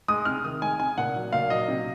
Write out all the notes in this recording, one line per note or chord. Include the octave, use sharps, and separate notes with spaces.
G#3 D#6
C3 F6
D#3 D#6
G#3 G#5
C3 G#5
A#2 F#5
F#3
A#2 F5
F#3 D#5
C3